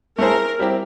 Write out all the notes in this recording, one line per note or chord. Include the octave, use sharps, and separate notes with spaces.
A3 C4 E4 G#4 A#4 C5
G3 C4 E4 G4